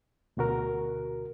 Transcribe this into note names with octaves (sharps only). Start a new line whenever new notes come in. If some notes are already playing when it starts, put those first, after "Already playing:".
D2 B2 F#4 A#4